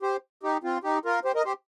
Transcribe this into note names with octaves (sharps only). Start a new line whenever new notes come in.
G4 C5
D#4 G4
C4 F4
D#4 G4
F4 A#4
G4 C5
A#4 D#5
G4 C5